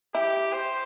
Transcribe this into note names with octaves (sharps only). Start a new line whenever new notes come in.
E4 G4
C5